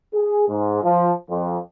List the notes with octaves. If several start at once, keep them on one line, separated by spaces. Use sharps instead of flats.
G#4
G#2
F3
F2